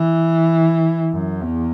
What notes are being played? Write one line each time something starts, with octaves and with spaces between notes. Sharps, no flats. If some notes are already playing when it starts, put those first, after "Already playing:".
Already playing: E3
F#2
E2